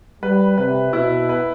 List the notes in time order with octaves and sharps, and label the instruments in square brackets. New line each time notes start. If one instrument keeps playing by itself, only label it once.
[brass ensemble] G3 [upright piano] B4
[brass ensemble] C3 [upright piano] B4
[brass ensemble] B2 [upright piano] E4
[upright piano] B4